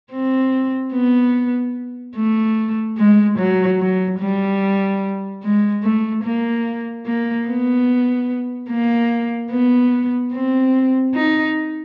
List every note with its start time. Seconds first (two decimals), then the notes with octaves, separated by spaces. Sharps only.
0.12 C4
0.93 B3
2.16 A3
2.98 G#3
3.39 F#3
3.80 F#3
4.20 G3
5.43 G#3
5.84 A3
6.24 A#3
7.06 A#3
7.47 B3
8.69 A#3
9.51 B3
10.33 C4
11.15 D#4